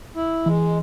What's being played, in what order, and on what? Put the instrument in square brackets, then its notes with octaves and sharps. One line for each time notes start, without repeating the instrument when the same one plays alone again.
[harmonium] E4
[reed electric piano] E3 [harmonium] G#3